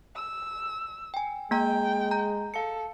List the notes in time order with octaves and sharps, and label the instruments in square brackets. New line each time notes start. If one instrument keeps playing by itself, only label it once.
[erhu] E6
[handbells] G5 G#5
[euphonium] G#3 [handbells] A#3 A#5 [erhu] G5
[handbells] A#5 G6
[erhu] A4 [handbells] F5 C#7